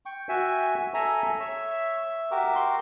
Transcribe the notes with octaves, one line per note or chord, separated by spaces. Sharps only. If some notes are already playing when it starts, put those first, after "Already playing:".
G5 C#6
F#4 E5 G#5
A4 E5 G#5 A#5
C#5 E5
F#4 G4 A#4
C6